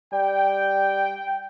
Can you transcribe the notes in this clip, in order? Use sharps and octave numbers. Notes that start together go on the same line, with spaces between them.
G3 G5